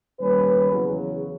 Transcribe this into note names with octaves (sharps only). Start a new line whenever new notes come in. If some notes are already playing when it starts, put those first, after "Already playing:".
D#2 G3 C#4 B4
E2 C#3 F#3